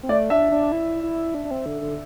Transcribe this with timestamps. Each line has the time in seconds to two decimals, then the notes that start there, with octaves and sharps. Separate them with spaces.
0.03 C4
0.09 A3 D5
0.30 D4 E5
0.51 D4
0.72 E4
1.03 E4
1.34 D4
1.45 D4
1.51 C4
1.66 D3
1.81 D3